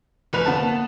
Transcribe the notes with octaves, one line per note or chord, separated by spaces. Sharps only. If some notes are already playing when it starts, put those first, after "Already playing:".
F1 B4 F7
D3 B3 C4 A5
A#3